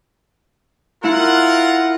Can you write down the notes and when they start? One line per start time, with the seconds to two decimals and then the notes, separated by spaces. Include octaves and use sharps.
1.04 E4 F4 A#4 F#5